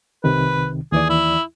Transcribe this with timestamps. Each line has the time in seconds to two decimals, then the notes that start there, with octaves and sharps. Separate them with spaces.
0.24 C2 C3 D#3 B4
0.92 D#2 E3 G#4 D5
1.09 E4